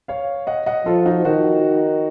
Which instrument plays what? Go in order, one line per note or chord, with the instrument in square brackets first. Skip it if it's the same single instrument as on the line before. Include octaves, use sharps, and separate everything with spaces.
[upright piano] C#5 F5
D#5 F#5
D#5 F#5
[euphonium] F3 [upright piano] F4 A4
[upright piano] D#4 F#4
[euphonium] D#3 [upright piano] D#4 F#4